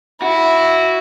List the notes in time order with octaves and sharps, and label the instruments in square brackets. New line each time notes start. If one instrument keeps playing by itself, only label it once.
[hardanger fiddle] E4 [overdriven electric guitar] F#4